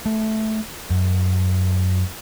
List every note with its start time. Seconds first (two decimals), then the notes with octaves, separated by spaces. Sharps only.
0.06 A3
0.90 F#2